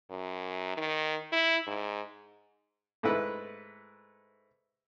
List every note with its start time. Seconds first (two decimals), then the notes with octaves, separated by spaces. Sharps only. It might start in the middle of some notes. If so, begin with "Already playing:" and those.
0.10 F#2
0.77 D#3
1.33 E4
1.67 G#2
3.03 G#2 A3 E4 B4